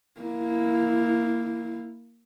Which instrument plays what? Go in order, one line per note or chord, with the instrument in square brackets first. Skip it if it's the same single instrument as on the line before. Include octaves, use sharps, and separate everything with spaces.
[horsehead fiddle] A#3 E4